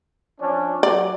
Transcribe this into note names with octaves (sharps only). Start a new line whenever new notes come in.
F3 C#4 D4
F#3 D5